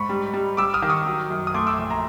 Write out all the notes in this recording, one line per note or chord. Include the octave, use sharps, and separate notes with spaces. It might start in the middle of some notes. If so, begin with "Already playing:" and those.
Already playing: G#2 B5 C#6
G3
G3
G3 D6 E6
D#6 F6
D#3
C#6 D#6
F#3
F#2
D#6
A3 C6 D6
D6 E6
A#1 C6 D6
A#5 C6